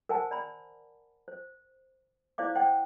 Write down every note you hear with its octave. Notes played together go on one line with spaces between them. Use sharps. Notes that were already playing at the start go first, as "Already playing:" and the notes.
A#4 C5 F#5 G#5 A5
D5 A#5 B5
C5
E4 C5 D5 F5 D6
C5 F#5 G5